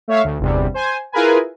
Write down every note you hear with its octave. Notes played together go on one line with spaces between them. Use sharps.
A3 C#5 E5 F5
D2
G1 E2 C3 G3
C5 G#5
E4 F4 G#4 A#4 B4 G#5